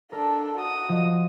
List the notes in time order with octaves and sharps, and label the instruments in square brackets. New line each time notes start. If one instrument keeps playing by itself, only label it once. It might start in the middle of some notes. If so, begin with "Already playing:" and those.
[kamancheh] D4 A4 [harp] A#4
[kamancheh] F#4 D#6
[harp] F3 D#5